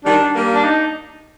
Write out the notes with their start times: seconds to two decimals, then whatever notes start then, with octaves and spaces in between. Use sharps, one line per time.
0.05 D#3 G3 D4
0.35 G3 A#3
0.55 D4
0.65 D#4